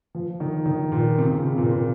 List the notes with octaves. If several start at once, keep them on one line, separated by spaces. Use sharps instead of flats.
F3
D#3
D#3
A#2
C3
C#3
C3
A#2
A#2